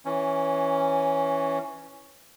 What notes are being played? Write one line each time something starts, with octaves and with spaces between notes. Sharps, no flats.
E3 C#4